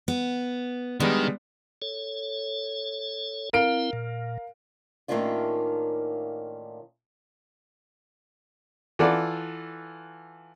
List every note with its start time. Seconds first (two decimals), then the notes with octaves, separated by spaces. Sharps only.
0.08 B3
1.00 D#3 G3 G#3 B3 D4
1.82 A4 C#5
3.53 C4 E4 A#4 F5 D7
3.93 A#2
5.08 A2 D#3 A#3 C#4 D4 F4
8.99 E3 F4 A4 D5 F#5